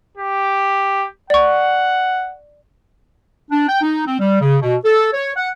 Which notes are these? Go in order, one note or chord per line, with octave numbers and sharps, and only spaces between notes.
G4
D5 F#5 C#6
D4
G5
D#4
C4
G3
C#3
B2
A4
C#5
F#5